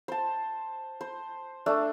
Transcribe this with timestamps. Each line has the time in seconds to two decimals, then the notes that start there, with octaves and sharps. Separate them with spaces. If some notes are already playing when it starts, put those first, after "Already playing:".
0.08 C5 A5
1.01 C5
1.66 A3 D4